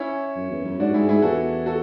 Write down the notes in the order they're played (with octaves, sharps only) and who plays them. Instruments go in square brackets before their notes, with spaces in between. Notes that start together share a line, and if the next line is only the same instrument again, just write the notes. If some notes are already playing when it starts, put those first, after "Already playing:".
Already playing: [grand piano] C#4 E4
[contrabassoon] F#2
E2
F#2
[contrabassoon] G#2 [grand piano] D4 F#4
[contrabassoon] G#2 [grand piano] E4 G#4
[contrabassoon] G#2 [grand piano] E4 G#4
[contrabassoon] E2 [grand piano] F#4 A4
[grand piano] F#4 A4